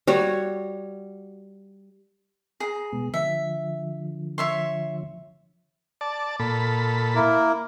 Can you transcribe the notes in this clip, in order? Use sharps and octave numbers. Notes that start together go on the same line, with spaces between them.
G3 F#4 C#5
G#4 A#5
B2 G#3 B3
D3 F3 E5
C#5 E5 C6
D5 A5
A#2 A4 B5
A#3 E4 A#4